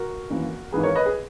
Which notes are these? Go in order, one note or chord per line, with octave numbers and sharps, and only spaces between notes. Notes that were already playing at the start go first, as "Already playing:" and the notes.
Already playing: F#4 A#4
G#1 F#2 E3 A#3
G#1 G#2 E3 G#4 B4
A#4 C#5
B4 D#5
G#4